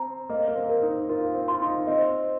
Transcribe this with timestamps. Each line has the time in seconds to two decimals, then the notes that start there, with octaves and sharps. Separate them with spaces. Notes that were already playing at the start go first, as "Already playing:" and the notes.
Already playing: C4 A#5
0.29 A#3 D#5
0.48 A#3
0.56 C4
0.69 A#4
0.83 D#4
1.09 F4 A#4
1.35 C4
1.48 F4 C6
1.62 D#4
1.87 C4 D#5